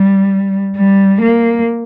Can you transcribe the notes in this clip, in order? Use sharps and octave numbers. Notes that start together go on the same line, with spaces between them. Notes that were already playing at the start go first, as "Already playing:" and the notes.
Already playing: G3
G3
A#3